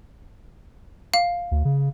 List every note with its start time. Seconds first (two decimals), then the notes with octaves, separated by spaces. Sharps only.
1.14 F5
1.51 D2
1.65 C#3